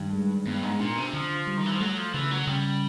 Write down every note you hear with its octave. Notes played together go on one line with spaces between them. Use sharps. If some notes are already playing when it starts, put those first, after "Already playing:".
Already playing: G2 D#3
G#3
G2 B3
G#2
A#2 D4
C3
D3 F3
G3
D#3
E3
F3
F#3 A3
F3
C#3 E3
F#3
C#3 G3